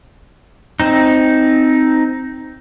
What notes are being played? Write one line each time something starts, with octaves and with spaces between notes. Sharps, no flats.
C4 D#4